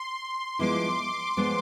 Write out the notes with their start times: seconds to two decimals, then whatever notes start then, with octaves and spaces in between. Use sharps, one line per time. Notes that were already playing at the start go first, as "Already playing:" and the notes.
Already playing: C6
0.59 F3 G#3 B3 E4 D6
1.37 F3 G#3 B3 D4